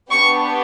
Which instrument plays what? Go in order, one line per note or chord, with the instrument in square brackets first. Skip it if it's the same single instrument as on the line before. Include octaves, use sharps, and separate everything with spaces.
[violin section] B3 D4 G4 C#6